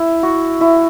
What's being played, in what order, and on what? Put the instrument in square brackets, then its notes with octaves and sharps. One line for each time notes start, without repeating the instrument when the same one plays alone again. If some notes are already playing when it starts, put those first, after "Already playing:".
Already playing: [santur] E4
F#4
E4